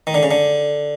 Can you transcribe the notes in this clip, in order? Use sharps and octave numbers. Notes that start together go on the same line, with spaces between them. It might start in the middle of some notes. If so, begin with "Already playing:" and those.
D#3
D3
C#3
D3